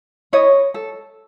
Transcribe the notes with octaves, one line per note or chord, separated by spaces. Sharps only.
E4 C#5 D#5
A4